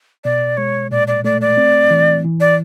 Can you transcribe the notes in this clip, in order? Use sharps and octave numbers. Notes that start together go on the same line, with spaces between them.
B2 D5
G#3 C#5
A#2 D5
D5
A3 D5
D5
C4
E3
E3
D5